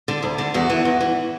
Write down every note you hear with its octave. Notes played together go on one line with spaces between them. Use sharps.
D3
D2
D3
E2 F#4
E3
E2
E3